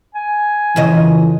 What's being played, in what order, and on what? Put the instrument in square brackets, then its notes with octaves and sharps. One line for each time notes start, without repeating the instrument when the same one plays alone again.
[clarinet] G#5
[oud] F2 C#3 D#5 [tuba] E3